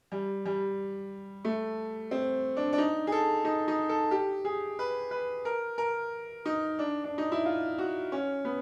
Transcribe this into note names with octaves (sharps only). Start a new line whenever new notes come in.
G3
G3
A3
C4
D4
D4
D#4
G#4
A4
D#4
D#4
A4
G4
G#4
B4
B4
A#4
A#4
D#4
D4
D4
D#4
E4
F4
F#4
C#4
B3